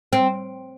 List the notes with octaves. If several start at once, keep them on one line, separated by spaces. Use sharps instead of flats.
C4